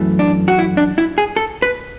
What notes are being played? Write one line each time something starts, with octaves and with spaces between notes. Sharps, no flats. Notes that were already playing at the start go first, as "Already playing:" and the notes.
Already playing: F#2 E3 A3
D4
F#4
E4
D4
E4
G#4
A4
B4